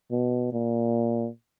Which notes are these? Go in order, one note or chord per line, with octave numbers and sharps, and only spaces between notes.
B2
A#2